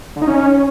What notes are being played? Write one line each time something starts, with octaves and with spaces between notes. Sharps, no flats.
D3
D#4
C#4